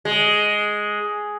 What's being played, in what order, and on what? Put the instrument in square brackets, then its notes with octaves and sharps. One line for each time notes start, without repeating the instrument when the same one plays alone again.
[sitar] G#3